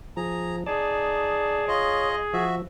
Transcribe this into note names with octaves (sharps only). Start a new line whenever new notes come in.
F3 G#4 A#5
D#4 G#4 D5 A5
F4 C#5 D#5
F3 F#4 E5